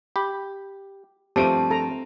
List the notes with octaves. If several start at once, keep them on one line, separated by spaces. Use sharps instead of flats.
G4 B5
G2 F3 A3 C4 G4 A5 D7 D#7
A4 A#5